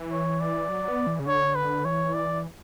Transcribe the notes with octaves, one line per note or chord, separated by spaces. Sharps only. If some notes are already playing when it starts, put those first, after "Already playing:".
Already playing: E3
C#5
D5
F#3
B3
E3
C#3
D3 C#5
B4
E3 C#5
D5